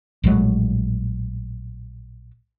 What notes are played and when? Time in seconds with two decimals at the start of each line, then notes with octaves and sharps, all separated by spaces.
0.24 A#1 A2 F#3 G#3